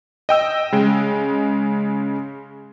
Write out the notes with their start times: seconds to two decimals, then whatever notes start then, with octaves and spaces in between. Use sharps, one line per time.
0.29 D#5 G5 E6
0.72 C#3 G#3